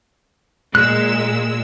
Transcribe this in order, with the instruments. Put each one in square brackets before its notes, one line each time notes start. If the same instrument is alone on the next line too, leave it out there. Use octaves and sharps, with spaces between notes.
[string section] A#2 G#3 E6 [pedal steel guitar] F#6